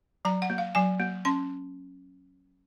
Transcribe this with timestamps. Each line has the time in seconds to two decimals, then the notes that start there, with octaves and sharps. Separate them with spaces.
0.25 F#3 A#5
0.42 F#5
0.50 A#3
0.58 F5
0.75 F#3 G#5
1.00 A#3
1.25 C#4 C6